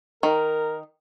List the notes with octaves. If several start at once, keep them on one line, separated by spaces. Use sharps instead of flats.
D#3 A#4